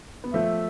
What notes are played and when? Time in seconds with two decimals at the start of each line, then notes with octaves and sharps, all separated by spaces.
0.24 B3
0.33 F3 A3 E5